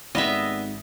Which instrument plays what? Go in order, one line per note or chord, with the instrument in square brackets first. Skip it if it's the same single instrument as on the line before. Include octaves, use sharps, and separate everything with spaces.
[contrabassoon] G#1 [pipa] G3 B3 [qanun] D#5 E5